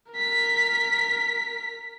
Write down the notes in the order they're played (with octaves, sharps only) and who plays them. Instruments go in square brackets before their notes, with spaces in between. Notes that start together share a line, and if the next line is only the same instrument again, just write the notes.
[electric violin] A#4 B6